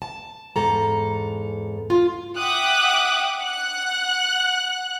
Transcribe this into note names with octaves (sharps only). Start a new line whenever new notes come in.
A5
E2 G#2 A4 A#5
F4
E5 F#5 G5 D6 D#6 F#6
F#5 F#6